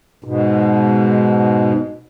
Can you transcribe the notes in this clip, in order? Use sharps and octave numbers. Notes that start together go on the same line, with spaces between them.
G#2 B2